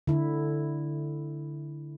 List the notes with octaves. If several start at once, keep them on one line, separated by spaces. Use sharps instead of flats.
D3 E4